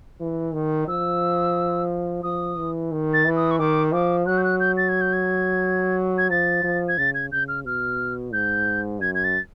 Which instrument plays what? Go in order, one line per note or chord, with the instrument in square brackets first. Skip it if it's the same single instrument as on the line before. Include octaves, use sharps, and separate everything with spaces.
[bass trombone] E3
D#3
[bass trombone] F3 [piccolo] E6
[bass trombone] F3 [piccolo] D#6
[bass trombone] E3
D#3
[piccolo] A6
[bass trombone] E3
[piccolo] D#6
C#6
[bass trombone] D#3 [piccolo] D6
[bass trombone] F3 [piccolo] D6
[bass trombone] F#3 [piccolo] F#6
[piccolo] G6
F#6
G6
A6
G#6
G6
G#6
G#6
[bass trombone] F3 [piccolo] A6
[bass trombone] F3
[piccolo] G#6
[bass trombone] C#3 [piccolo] A6
[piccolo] G#6
[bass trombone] C#3 [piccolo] G6
[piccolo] F6
[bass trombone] B2 [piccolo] F6
[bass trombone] G#2 [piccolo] G6
[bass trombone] F#2 [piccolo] G#6
[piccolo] G#6
A6